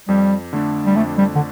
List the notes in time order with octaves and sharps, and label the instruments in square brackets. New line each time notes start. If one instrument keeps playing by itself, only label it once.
[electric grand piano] F2 [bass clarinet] G3
[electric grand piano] D3 A3 D4
[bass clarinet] G3
[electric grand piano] F2 [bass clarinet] A3
[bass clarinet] G3
D3